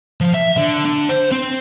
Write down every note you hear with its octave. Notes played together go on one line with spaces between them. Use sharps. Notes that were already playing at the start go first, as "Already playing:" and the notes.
F3
E5
D3
D3
C5
C4